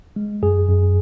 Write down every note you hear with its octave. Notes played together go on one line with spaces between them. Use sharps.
G#3
F#2 G#4
F#2